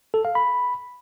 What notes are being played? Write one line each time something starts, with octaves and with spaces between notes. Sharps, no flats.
A4
F5
B5